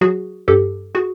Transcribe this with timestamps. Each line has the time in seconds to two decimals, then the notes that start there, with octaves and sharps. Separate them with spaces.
0.01 F#3 F#4 G#4
0.48 G2 G4 A4
0.95 F#4 G#4